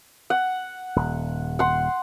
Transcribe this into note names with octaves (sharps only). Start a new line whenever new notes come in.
F#5
D#1
F#5 C6